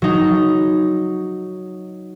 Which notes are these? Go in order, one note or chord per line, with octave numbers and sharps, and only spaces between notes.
F#3 D#4